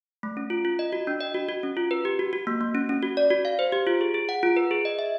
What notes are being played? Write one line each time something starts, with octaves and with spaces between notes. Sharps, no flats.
A3
C#4
F4
F4
D#5
F#4
D4
D#5
F#4
F#4
C#4
F4
B4
G4
F#4
F#4
A#3
A#3
C#4
C#4
F#4
D5
F#4
F5
C5
G4
F4
G#4
G#4
F#5
F4
B4
G#4
D#5
E5